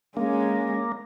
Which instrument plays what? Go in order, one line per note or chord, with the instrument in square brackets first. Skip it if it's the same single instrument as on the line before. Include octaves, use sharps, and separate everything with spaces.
[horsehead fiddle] G#3 C#4 [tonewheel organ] A#3